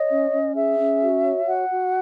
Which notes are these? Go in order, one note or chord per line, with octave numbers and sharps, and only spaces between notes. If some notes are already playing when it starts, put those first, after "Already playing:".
Already playing: C#5 D#5
C#4
C#4
G#4 E5
C#4
F#4
C#5
F#4 F#5
F#4